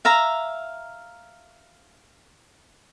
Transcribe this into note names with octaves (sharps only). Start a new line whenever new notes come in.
E5 F5 A#5